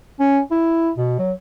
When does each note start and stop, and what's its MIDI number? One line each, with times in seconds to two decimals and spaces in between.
0.19 0.39 61
0.51 0.90 64
0.98 1.16 47
1.19 1.32 54